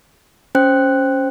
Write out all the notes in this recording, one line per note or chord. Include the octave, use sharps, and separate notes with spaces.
C#4 C5 G5 F#6